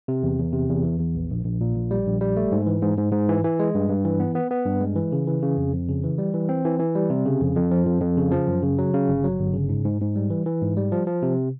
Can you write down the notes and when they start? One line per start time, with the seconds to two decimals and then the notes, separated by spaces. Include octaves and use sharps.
0.08 C3
0.23 E2
0.38 E2
0.53 C3
0.69 E2
0.84 E3
0.99 E2
1.15 A#1
1.30 A#1
1.45 A#1
1.61 A#2
1.75 A#1
1.91 G3
2.07 A#1
2.21 G3
2.37 A3
2.52 G#2
2.67 E3
2.82 G#2
2.97 G#2
3.12 G#2
3.29 E3
3.44 E3
3.59 G#3
3.75 G2
3.89 G2
4.05 E3
4.20 B3
4.35 B3
4.51 B3
4.65 G2
4.81 G#3
4.96 E3
5.12 C#3
5.27 E3
5.43 C#3
5.57 F2
5.73 F2
5.88 C#3
6.03 E3
6.18 G3
6.34 E3
6.49 C4
6.65 E3
6.80 E3
6.95 G3
7.10 C3
7.26 C#3
7.41 F2
7.56 F2
7.71 F3
7.86 F2
8.02 F2
8.17 C#3
8.32 F3
8.47 F#2
8.63 C#3
8.78 F#3
8.94 C#3
9.08 G1
9.24 F#3
9.40 G1
9.54 C#3
9.69 G#2
9.85 G#2
10.01 G#2
10.16 G3
10.30 E3
10.46 E3
10.62 G#2
10.77 G3
10.92 F3
11.07 F3
11.22 C3